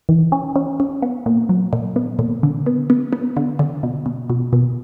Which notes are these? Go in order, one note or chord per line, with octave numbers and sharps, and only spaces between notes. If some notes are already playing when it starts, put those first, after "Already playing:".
E3
C#4
C#4
C#4
B3
A#2
F#3
A#2
B3
A#2
D3
B3
B3
B3
D3
D3
B2
B2
B2
B2